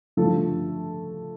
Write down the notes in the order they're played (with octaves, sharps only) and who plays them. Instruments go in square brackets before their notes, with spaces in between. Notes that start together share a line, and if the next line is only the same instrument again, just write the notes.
[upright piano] G2 D3 F3 A3 A4